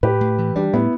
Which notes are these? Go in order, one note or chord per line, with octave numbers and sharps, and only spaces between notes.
A2 G4 B4
A2
E3
G3 D4 G4
A2 B3 E4